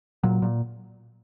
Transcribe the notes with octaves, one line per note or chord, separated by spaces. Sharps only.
A#2 F#3
A#2